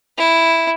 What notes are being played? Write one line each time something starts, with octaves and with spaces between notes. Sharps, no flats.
E4